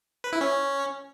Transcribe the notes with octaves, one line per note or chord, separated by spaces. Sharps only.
B4
E4
C#4